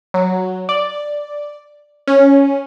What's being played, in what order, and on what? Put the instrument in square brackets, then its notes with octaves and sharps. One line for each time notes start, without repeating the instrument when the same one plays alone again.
[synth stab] F#3
D5
C#4